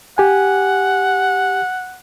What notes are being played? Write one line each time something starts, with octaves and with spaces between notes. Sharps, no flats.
G4 F#5 G#5